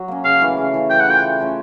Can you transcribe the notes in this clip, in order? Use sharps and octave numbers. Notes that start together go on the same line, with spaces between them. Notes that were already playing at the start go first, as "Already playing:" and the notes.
Already playing: F#3
A#3 C#4
C#3 F5
E3 A3
C#3
E3 A3
E3 G5
F#5
A3 C#4 F4 G5
E3
A3 C#4 F4